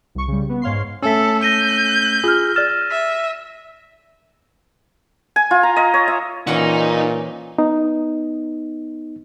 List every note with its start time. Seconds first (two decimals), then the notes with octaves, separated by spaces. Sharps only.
0.15 C2 C#6
0.28 C#3 G3
0.49 B3
0.62 G#2 C#5 F5 C6 C7
1.03 A3 C#4 A4 E6 B6
1.43 G6 A#6 B6 D#7
2.24 F4 G#4 F6
2.56 D5 F6 A6 E7
2.91 E5 B6
5.36 G#5
5.51 F4
5.63 A#5
5.76 D#5
5.94 C#5
6.08 E5
6.47 A#2 E3 C#4 D#4 F#5
7.58 B3 D#4